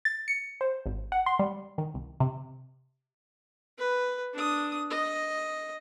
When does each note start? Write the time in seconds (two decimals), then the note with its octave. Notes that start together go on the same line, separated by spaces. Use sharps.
0.05 A6
0.28 C#7
0.61 C5
0.86 G#1
1.12 F#5
1.26 C6
1.39 G3
1.78 D#3
1.94 C2
2.20 C3
3.78 B4
4.34 D4 D#6
4.90 D#5